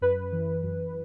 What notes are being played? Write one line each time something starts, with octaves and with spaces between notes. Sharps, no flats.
F#2 B4
E3
F#2